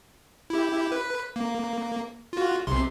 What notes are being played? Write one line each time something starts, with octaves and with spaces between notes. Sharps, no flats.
E4 G4
B4
A#3
F4 F#4
B1 C3 C6